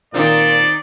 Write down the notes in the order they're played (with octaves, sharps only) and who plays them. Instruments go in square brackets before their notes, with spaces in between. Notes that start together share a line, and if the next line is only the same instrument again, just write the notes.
[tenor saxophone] A#2 [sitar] D#3 C4 D#4 [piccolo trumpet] D5